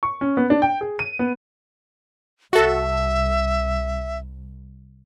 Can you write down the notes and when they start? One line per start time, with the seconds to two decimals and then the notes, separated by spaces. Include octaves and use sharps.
0.03 C#6
0.21 C#4
0.37 B3
0.50 D4
0.62 G5
0.81 G#4
0.99 D#7
1.19 B3
2.53 C2 F#4 A4 E5